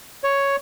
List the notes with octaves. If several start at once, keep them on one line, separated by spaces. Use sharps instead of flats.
C#5